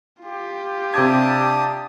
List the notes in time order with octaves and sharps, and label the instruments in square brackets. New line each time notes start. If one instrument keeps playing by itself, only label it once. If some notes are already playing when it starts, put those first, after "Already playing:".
[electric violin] F4 G4
[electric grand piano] C3 D6 G#6 [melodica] D4 A5 D#6